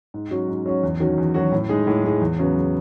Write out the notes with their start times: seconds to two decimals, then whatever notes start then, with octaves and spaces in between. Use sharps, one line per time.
0.14 G#2
0.31 F#3 C#4 F#4
0.48 G#2
0.66 F#3 C#4 F#4
0.83 E2
1.00 D#3 F#3 C#4 F#4
1.18 E2
1.34 D#3 F#3 C#4 F#4
1.52 A2
1.69 G#3 D#4 G#4
1.87 A2
2.03 G#3 D#4 G#4
2.21 E2
2.39 C#3 F#3 B3
2.55 E2